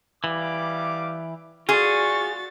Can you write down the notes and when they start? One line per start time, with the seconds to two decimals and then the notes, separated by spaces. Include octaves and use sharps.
0.24 E3 G3 F5 D6
1.69 F4 F#4 G#4 D5 C#6 A6